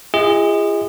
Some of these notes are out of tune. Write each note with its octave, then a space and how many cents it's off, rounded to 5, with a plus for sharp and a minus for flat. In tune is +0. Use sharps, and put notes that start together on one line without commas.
F4 -40 G#4 -30 D#5 +30